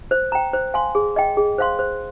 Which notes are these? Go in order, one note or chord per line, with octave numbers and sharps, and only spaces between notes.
C5
G5 A#5
C5
F5 G#5 C6
G#4
D#5 G5
G#4
C5 F5 C6
C5